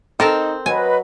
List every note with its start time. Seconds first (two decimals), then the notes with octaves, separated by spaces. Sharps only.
0.20 C4 D#4 A4 A#4 A5
0.66 F#3 B4 D#5 G#5